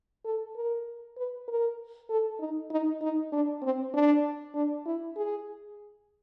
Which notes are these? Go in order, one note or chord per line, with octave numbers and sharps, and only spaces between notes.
A4
A#4
B4
A#4
A4
D#4
D#4
D#4
D4
C4
D4
D4
E4
G#4